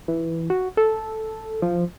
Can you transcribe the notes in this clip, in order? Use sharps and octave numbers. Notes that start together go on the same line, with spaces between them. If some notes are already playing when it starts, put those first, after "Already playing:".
E3
F#4
A4
F3